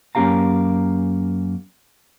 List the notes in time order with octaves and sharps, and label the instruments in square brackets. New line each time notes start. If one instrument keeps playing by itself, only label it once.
[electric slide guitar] F#2 A#3 C#4 G4 F5 A#5